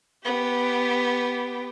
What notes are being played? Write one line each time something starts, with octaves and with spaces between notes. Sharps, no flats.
B3 G4